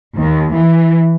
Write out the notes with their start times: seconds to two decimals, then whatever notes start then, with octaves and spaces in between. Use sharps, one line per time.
0.16 D#2
0.57 E3